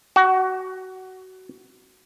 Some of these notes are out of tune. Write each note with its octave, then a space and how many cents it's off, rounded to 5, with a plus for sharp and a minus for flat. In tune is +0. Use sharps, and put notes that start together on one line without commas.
F#4 +20